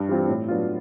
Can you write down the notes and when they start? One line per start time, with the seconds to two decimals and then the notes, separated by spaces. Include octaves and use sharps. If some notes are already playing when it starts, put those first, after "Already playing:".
Already playing: G2
0.08 E3 G3 C4 F4
0.28 A2
0.48 F#3 B3 D4 F4